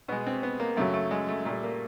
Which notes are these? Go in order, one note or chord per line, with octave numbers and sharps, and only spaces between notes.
B2 G#3 B3
C4
B3
A#3
F#2 C#3 F#3 A3
A3
G#3
A3
A#2 G3 A3
A#3